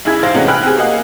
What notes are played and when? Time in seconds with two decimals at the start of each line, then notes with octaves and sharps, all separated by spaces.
0.05 B1 F#2 E4 G#4 G#6
0.22 A1 G#2 C5 F5 A#6
0.34 A2 C3 E3 G#3 C#4 F#4
0.48 G5 G#5 B5 F6 F#6
0.63 C4 G4 G#4
0.77 A#3 F#4 G#4 D#5 F5 F#5